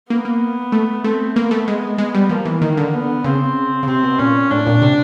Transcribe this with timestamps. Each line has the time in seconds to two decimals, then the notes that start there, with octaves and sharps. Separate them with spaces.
0.10 A#3 B3
0.25 A#3
0.72 A3
1.04 A3 C4
1.35 A#3 B3
1.51 A3
1.68 G#3
1.98 G#3 B3
2.14 G3
2.30 F3 A#3
2.46 E3
2.61 D#3 A#3
2.77 D3
2.93 B3
3.24 C#3 C4
3.83 C#3
3.87 C3 C4
4.03 B2
4.18 A#2 C#4
4.51 A2 D4
4.66 A#2
4.82 C3